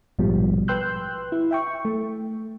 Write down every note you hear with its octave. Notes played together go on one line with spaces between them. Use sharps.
A#1 G#2 B2 F3 G3
B4 G5 C6 E6 F#6 G6
E4
E5 G5 C#6
A3